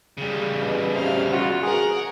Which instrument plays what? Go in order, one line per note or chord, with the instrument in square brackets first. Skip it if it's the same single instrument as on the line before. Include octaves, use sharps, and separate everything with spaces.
[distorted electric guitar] C#3 G3
[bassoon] B2
[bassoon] C3 [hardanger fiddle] F5
[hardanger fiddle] F4 [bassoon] F#4
[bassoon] G#4 [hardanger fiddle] A#4 F#5